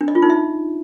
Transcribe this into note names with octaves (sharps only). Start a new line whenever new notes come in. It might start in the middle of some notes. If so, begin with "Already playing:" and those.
D4
D#5
F4
D#4
E5